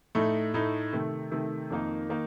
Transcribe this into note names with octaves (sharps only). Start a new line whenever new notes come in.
A2 A3 D#4
A2 A3 D#4
C3 D#3 A3
C3 D#3 A3
F2 D#3 A#3 D#4
D#3 A#3 D#4